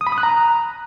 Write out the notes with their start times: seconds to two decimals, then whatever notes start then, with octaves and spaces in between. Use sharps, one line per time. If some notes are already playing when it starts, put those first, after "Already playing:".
0.01 D#6
0.07 B5
0.12 D#6
0.18 F#6
0.23 A#5